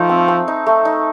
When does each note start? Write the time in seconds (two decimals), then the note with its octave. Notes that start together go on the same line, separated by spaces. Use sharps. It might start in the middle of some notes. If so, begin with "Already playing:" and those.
Already playing: F3 A3 D#4
0.09 C4
0.28 C4
0.48 D#4
0.66 A3
0.85 D#4